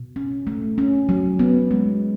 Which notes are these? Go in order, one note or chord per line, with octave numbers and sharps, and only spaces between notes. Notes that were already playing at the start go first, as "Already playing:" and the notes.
Already playing: B2
C#4
A3
C#4
F#3
B3
G#3